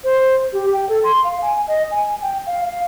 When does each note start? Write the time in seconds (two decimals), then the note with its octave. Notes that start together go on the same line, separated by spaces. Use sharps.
0.04 C5
0.53 G4
0.73 G5
0.89 A4
1.04 C6
1.24 F5
1.42 G#5
1.68 D#5
1.91 G#5
2.22 G5
2.47 F5
2.65 F5